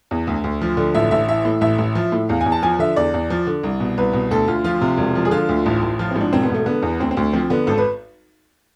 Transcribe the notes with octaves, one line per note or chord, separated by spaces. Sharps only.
E2
D2
D2
F3
D3
A1 E5
A1 E5
E3 E5
A2
A1 E5
A1
F3
A2
E2 F5
G#5
E2
A5
F3 G#5
D3 E5
E2 D5
E2
F3
D3
C2
B2
C2 B4
B2
D2 A4
D2 F4
F3 F4
C3
E1
F3
G#4
D3 F4
D2
A1
A1
F3 F4
G#2 C4
D4
E1 C4
B3
E1
A3
D3 B3
E2
D2 C4
C4
D2
F3 C4
D3 B3
G#1 A4
B4